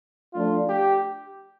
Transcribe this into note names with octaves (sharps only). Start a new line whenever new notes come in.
F3 A3 D4 F4
G4